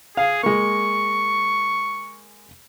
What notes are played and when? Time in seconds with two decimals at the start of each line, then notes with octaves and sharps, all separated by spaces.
0.17 G#4 F5
0.43 G#3 A#3 C#6